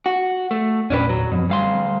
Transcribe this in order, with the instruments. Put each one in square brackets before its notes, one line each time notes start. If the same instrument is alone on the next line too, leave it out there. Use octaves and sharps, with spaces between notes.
[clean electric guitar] F#4
A3
[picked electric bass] G#1 E2 A#2 [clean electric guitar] C#4 D4 B4
[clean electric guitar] F#3
[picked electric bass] F#2 F3 C4 [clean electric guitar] B2
[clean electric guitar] D2 F5 C6 [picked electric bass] G3